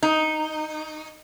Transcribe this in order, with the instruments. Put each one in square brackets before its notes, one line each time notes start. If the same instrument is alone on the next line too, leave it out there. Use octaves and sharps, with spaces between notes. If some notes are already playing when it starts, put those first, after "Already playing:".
[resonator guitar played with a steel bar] D#4